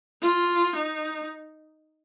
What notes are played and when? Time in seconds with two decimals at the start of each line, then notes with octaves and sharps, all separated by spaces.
0.22 F4
0.76 D#4